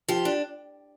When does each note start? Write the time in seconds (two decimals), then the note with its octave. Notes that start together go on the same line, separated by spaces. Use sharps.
0.08 F3 G4
0.25 D4